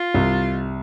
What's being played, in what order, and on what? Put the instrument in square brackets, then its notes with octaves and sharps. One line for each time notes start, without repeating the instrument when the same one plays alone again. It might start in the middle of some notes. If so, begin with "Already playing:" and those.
Already playing: [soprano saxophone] F4
[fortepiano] C2